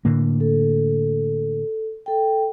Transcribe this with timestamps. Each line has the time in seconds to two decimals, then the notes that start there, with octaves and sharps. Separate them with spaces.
0.05 A2 D3 A#3
0.40 A4
2.06 A4 G5